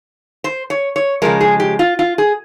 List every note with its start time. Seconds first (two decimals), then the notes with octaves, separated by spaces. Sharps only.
0.44 C5
0.70 C#5
0.96 C#5
1.22 C#3 F3 G#3 A#4
1.41 G#4
1.60 G4
1.79 F4
1.99 F4
2.18 G#4